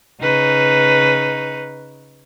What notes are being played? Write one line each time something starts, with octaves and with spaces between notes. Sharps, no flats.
C#3 D#4 B4